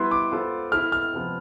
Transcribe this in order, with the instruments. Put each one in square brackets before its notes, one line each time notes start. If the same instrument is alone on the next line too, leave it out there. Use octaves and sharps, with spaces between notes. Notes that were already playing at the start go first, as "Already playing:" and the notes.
Already playing: [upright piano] G3 B3 E4 B4 [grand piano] C6
[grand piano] D6
[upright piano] B3 F4 A4 C5
[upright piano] B3 E4 A4 [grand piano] F6
[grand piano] F6
[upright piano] C3 F3 B3